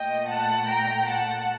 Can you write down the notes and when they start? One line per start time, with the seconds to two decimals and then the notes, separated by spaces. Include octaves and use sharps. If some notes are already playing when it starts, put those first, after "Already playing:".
Already playing: A#2 A3 D#5 G5
0.28 F#5 A5
0.67 G5 A#5
1.06 F#5 A5